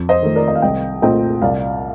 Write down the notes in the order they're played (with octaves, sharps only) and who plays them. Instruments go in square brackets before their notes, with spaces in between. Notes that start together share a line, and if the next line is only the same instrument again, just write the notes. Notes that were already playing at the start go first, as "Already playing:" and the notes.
Already playing: [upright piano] F2
C5 D#5
D#3 A3
A#4 D5
D#5
F5
C2 D#5 G5
A#2 A3 C4 D#5 G5
C2 D5 F5